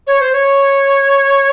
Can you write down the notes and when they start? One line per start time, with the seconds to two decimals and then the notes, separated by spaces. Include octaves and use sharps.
0.07 C#5
0.20 C5
0.33 C#5